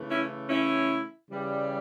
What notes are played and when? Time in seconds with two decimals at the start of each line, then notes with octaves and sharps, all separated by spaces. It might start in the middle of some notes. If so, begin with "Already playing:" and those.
Already playing: C#3 E3 A3
0.08 C#4 E4
0.49 C#4 E4
1.31 C#3 E3 G3